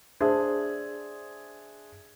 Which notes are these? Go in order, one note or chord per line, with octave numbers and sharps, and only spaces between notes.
D4 G#4 C5 E5